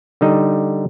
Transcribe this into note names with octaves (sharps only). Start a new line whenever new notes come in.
D3 G3 D#4 D#5